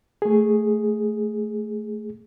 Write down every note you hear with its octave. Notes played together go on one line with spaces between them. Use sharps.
A3 G#4